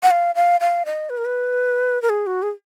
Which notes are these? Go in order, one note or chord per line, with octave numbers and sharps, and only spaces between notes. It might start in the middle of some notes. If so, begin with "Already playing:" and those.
F#5
F5
F5
F5
D#5
B4
A#4
B4
A#4
G#4
F#4
G#4